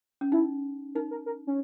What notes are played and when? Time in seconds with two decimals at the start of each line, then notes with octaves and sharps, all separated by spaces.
0.21 C#4
0.32 D#4 E4
0.95 D#4 A#4
1.11 A#4
1.26 A#4
1.47 C#4